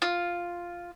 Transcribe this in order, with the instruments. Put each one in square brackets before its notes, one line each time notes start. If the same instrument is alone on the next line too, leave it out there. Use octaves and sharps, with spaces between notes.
[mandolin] F4